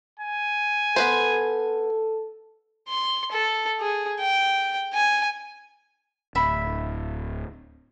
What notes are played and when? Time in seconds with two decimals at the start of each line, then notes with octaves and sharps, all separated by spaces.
0.19 G#5
0.96 B3 A4 B4 C5
2.89 C6
3.32 A4
3.80 G#4
4.20 G5
4.94 G#5
6.35 D1 E5 B5